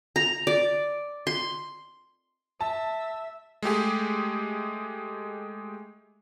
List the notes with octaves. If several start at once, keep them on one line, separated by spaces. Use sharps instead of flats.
A#5
D5
C6
E5 A5
G#3 A3 G4 G#4